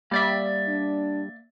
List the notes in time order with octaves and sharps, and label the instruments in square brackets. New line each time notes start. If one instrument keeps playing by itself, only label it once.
[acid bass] G3 [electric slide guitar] A#3 D5 E5
[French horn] D4